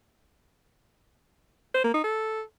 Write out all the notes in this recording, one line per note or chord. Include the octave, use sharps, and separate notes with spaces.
C5
A#3
D#4
A4